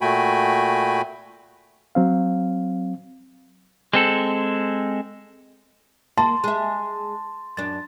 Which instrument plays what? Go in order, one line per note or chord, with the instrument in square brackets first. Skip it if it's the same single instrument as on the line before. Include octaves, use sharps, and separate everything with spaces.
[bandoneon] A#2 A3 F#4 G5 G#5 B5
[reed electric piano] F#3 C4 F5
[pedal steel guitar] G#3 C4 A4
[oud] A#3 [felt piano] A5 [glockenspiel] C6
[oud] G#3 E5
[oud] F#2 D4 [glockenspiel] A6